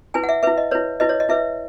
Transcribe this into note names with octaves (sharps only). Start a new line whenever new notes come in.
E4 B4 G#5
F#5
E5
E4 B4 E5
D#5
E4 B4 C#5
E4 B4 D#5
C#5
D#5
E4 B4 E5